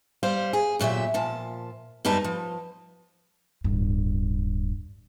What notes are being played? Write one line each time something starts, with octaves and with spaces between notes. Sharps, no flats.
G3 C5 F5
G#4
D2 A#2 F#3 G4 E5
A#2 F3 A5
F#2 G3 D#4 B4 A5
F3
D1 G2